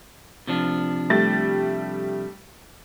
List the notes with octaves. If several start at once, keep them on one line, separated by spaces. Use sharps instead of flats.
C3 F3 D4
G3 A3 A6